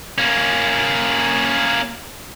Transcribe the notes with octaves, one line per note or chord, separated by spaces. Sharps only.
A#3 C#4